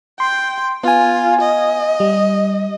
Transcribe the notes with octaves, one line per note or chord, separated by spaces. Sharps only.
G5 C6
B3 F4 G#5
D#5
G3